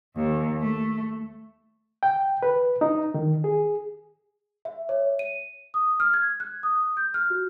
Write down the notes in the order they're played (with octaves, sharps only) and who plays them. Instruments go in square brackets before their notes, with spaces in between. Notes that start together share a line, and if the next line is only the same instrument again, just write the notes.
[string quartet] D#2
A3
[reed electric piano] G5
B4
D#4
D#3
G#4
[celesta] E5
C#5
D#7
D#6
F6
G#6
F#6
D#6
G6
F6
F#4